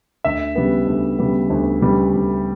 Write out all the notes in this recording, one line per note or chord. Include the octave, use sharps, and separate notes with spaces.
D2 E5
C#3 G3 B3
D2
C#3 G3 B3
D2
C#3 G3 B3
D2